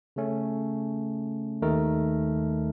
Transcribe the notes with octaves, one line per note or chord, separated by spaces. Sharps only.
C#3 A3 C#4
D#2 D#3 A3 D#4 A#4